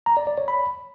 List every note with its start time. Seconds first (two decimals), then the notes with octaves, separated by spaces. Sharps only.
0.06 A#5
0.17 D5
0.27 D5
0.38 C#5
0.48 B5